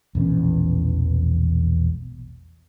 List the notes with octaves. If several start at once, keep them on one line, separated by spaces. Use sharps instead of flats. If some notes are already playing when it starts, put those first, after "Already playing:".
E1 A#1 E2 C#4